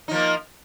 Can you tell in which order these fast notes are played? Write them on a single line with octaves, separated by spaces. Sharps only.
D#4 F3 A#3